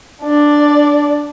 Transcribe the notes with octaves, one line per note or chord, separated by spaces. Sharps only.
D4 D5